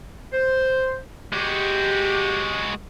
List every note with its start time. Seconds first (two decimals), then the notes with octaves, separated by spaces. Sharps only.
0.33 C5
1.33 G#3 F#4 G4